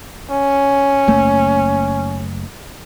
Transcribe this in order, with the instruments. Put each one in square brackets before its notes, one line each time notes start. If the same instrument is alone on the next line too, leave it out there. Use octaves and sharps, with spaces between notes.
[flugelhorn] C#4
[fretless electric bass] F#1 A3 A#3